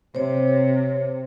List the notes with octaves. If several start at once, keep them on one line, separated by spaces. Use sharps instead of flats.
C3 C5 C#5